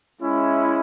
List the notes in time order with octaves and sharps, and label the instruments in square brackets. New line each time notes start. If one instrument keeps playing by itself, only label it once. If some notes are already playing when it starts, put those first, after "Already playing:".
[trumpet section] G#3 C#4 E4